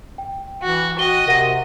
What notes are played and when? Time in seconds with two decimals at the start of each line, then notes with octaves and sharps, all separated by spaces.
0.18 G5
0.63 E3 F#4
0.99 F#4 D#5 G5 G7
1.28 C3 A#4 F#5 D#7